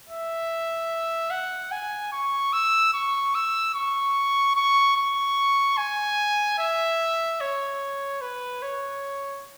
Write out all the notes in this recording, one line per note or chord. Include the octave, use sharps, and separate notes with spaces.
E5
F#5
G#5
C#6
E6
C#6
E6
C#6
C#6
C#6
G#5
E5
C#5
B4
C#5